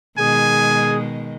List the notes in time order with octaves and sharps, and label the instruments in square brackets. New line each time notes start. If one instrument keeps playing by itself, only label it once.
[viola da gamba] B2 D#3 G#3 [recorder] G#4 [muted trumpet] G#5